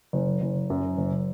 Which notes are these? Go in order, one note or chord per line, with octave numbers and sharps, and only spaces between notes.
F#1
F#1
F#2
F#1